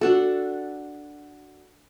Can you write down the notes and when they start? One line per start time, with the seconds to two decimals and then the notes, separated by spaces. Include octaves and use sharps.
0.01 D4 F#4 A4